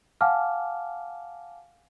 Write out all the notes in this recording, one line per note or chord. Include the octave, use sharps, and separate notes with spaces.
F5 F#5 G#5 A5 D6 F6